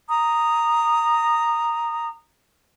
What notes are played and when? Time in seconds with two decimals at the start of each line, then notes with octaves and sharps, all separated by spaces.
0.09 A#5 D#6